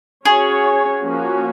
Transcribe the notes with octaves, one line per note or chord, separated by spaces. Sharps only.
C#4 F#4 G#4 C#5
F3 A#3 C#4 F#4